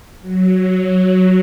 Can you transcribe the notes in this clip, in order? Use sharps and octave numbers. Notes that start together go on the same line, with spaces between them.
F#3
F#3